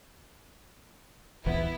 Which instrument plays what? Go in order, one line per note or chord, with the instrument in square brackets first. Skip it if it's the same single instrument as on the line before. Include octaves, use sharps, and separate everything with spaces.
[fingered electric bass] D#1 A#1 E3 [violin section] B3 E4